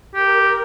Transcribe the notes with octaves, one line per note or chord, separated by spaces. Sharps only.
G4 A#4